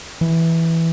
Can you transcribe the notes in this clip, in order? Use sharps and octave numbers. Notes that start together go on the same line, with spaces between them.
E3